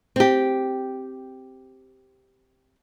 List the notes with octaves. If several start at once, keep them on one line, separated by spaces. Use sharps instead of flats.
C4 G4